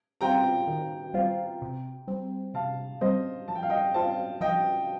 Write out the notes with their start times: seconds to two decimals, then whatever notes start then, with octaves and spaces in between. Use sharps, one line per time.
0.21 G3 C4 F4 G5 A#5
0.67 D#3
1.14 G3 C4 F4
1.62 C3
2.08 G3 C4
2.54 C3 F5 A5
3.01 G3 C4 C5 D#5
3.48 F3 A5
3.55 G5
3.63 F5
3.70 D#5 G5
3.94 C4 F4 F5 A5
4.41 F3 D#5 G5